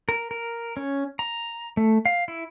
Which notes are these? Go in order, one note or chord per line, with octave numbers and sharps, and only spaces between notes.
A#4
A#4
C#4
A#5
A3
F5
E4